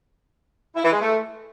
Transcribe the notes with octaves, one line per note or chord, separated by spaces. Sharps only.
E4
E3
G#3
A3